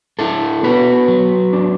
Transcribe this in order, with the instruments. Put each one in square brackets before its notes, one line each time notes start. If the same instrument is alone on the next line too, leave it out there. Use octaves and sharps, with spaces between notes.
[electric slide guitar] D4 E4 A4
B3 F#4 B4
F#3
D4